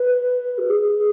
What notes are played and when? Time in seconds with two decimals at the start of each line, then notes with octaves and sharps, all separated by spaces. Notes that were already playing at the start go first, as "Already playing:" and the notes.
Already playing: B4
0.58 F#4
0.69 G#4